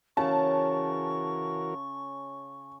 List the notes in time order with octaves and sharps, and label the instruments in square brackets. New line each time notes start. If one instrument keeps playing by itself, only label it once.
[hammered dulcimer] C#3 [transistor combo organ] E3 F#4 A#4 [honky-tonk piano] A5 [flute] C#6